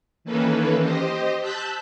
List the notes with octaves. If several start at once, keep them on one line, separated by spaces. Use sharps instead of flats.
D#3 E3 A#3 C#4 A4 B4
G4 C5 D#5
A5 E6 F#6 G6 B6